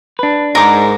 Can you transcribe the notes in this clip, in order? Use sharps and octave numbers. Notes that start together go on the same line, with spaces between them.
D4 B4
G#2 A#4 D6